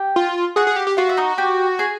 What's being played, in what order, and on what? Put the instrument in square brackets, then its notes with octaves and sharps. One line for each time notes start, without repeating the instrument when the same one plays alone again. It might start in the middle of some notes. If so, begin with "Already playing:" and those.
Already playing: [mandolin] G4 G5
[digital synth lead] F4
[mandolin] F#4 F#5 [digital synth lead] G#4
[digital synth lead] G#4
G4
G4
[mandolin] F4 F5 [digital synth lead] F#4
[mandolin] E5
D#4 D#5
G4 G5
G#4 G#5